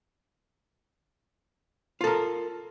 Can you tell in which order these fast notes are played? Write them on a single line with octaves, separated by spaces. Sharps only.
F4 A4 A#4